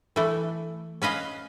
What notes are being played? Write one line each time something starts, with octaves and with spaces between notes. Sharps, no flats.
E3 A3
C#4 B4 D#5 F5